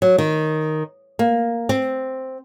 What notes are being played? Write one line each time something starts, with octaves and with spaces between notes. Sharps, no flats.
F#3
D#3
A#3
C4